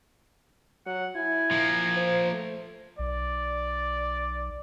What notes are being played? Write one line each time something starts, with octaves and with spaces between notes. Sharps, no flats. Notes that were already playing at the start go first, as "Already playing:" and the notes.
F#3 F#5
E4 G#5
F3 A#3
C5
A3
B1 D5